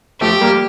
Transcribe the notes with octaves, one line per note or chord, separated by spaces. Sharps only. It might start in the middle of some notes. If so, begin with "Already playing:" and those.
F3 A3 G4
G3 A#3